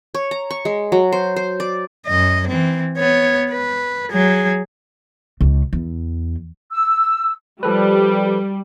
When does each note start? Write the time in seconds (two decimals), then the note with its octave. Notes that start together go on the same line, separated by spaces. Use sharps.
0.14 C#5
0.31 A#5
0.51 C#6
0.65 G#3
0.92 F#3
1.12 C5
1.36 C5
1.60 D5
2.07 F#2 D#5
2.48 E3 C4
2.98 B3 C#5
3.51 B4
4.12 F#3 G#4
5.41 C#2
5.73 E2
6.71 E6
7.63 F3 G3 A4 B4